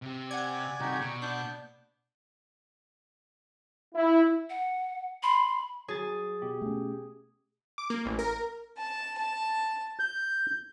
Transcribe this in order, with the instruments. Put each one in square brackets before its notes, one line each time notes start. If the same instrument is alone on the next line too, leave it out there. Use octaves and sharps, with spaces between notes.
[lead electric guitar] C3 G4
[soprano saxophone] D5 [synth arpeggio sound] F#5 G#5 G#6
[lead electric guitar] C3 D4 [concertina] D#4 F#4 G4
[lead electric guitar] B2 [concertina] C#6
[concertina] B3 [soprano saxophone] D4 [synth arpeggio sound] G6
[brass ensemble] E4
[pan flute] F#5
[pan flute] B5 [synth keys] C6
[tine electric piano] F#3 A6 [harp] G#4
[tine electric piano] B2 G4
[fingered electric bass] A3 C#4
[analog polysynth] D6
A#3
A1
A#4
[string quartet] A5
A5
[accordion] G6